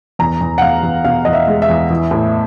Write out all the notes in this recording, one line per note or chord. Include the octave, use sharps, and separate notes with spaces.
E2 A#5
E2
F#5
E2 F5
E2
B2 F5
E2 D#5
E5
G#3
E5
E2
E3
A2